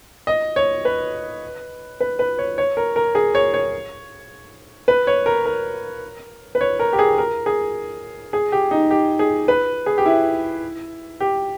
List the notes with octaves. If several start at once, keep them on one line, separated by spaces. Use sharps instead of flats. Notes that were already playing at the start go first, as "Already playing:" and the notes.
D#5
C#5
B4
B4
B4
C#5
C#5
A#4
A#4
G#4
C#5
C#5
B4
C#5
A#4
A#4
B4
C#5
A#4
G4
G#4
A#4
G#4
G#4
G4
D#4
G4
G#4
B4
G#4
G4
E4
G4